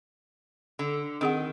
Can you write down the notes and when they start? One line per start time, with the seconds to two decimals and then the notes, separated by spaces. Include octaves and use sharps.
0.79 D3
1.21 D#3 C4 G#4 F#5